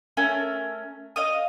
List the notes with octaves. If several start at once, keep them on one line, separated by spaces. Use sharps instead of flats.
A3 C#4 A#4
D#5 F5 D#6